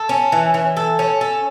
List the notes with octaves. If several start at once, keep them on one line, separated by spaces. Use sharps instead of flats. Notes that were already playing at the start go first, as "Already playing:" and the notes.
Already playing: A4
C#4
E3
E3
A4
C#4
A4